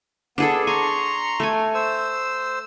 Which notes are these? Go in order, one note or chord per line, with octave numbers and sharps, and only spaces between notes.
B3 D4 G#4 A4
G#5 A#5 C6 C#6
A3 G#5
C5 E6